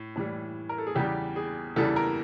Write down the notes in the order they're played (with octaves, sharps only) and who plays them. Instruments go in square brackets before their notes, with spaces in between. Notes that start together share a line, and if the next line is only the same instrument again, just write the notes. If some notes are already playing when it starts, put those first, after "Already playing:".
Already playing: [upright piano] A2
A2 E3 G3
A#4
A4
G#4
E2 C#3 E3 G3 G4
G#4
E2 C#3 E3 G3 A4
A#4